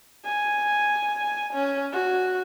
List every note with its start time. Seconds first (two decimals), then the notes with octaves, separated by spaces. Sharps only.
0.25 G#5
1.54 C#4
1.93 F#4